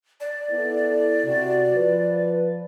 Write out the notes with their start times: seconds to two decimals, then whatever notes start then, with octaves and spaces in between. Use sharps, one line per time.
0.21 D5
0.50 B3 E4 A4
1.25 C3 F#4
1.73 F3 B4